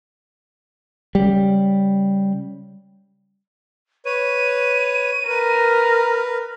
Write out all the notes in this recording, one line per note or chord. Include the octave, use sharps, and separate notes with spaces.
C#3 G3
B4 C#5 D#7
A#4 B4